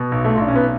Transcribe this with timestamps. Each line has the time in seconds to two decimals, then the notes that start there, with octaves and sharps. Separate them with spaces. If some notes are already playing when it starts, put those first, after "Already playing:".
Already playing: B2
0.12 B1
0.25 A3
0.34 F4
0.37 B1 D4
0.48 C#4
0.56 B3